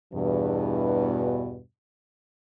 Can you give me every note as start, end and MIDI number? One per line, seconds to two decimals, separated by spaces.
0.14 1.60 40
0.14 1.60 43
0.14 1.60 47